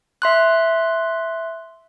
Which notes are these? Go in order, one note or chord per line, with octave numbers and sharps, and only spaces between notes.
E5 C6 F#6